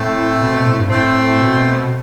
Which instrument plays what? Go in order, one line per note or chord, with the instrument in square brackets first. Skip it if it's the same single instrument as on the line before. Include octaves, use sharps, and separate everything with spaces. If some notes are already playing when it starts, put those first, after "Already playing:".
Already playing: [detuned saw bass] A2 [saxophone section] A3 C4
[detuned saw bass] B2
B2
A2
G2
[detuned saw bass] A2 [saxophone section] A3 C4
[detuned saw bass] B2